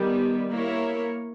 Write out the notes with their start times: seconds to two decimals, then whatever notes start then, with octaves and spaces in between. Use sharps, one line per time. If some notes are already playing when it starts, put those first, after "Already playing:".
Already playing: D#3 G3 B3
0.50 A#3 E4 A#4 C#5